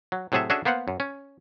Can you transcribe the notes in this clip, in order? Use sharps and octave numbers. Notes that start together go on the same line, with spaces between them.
F#3
A2 C3 F#3 G#4 A4 E5
C#4 D4 F#4 G#4 A4 E5
A#3 B3 C5 F5 F#5
F#2
C#4